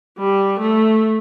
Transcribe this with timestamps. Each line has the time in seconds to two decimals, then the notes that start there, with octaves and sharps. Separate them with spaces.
0.19 G3
0.60 A3